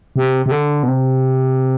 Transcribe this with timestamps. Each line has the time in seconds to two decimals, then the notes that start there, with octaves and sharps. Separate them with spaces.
0.16 C3
0.46 C3
0.52 D3
0.83 B2
0.88 C3